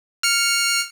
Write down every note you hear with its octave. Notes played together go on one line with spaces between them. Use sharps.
F6 C#7